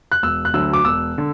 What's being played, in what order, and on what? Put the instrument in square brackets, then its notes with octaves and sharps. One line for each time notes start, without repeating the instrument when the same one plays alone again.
[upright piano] F#6
E1 E6
F#6
D2 D3 F#3 E6
D6
E1 E6
D3